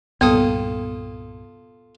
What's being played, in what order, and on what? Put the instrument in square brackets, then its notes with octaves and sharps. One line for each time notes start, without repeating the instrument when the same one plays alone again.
[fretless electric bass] C2 G2 A#2 [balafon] B3 [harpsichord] F4 A4 D#6